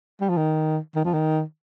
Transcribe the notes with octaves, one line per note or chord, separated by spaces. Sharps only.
G3
F3
D#3
D#3
F3
D#3